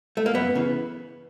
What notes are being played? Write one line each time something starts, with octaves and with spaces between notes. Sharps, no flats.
A3
A#3
F#2 B3
C#3 E3